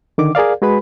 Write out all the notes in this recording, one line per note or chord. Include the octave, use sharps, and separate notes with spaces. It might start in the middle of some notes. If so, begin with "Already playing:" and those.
D3 D#3 D6
G#4 A#4 D5 F5
G#3 F#4 G#4 B4 B5